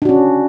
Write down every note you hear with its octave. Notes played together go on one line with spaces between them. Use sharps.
C#4 D4 F#4